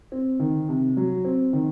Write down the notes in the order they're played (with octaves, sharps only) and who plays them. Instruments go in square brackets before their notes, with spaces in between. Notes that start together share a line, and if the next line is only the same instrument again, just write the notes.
[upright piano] C4
D#3
C3
F#3
C4
D#3